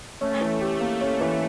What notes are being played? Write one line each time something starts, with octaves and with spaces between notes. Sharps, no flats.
A3 C#4
E3
G4
A#3
C#4
E3